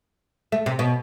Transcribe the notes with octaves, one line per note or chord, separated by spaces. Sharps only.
A3
C3
B2